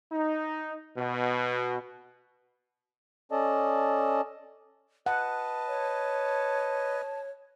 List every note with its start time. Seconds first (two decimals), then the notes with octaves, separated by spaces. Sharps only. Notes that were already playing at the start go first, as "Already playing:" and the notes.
0.11 D#4
0.98 B2
3.32 C#4 A4 D5 D#5 A5
5.06 B4 D#5 F#5 A5
5.68 C#5